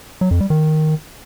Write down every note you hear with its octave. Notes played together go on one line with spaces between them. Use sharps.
F#3
F2
G3
D#3